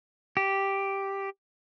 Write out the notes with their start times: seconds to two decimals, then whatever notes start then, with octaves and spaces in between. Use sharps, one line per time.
0.37 G4